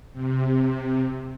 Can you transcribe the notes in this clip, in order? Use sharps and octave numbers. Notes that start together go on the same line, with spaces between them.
C3